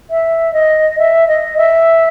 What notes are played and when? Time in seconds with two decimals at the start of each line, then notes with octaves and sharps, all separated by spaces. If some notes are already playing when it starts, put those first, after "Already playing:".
0.10 E5
0.53 D#5
0.98 E5
1.27 D#5
1.57 E5